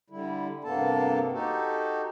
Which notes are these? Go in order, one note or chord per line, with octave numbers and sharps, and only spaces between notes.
D3 G3 E4
G2 C3 A#3 B3 A4 A5
D#4 F#4 G4 A4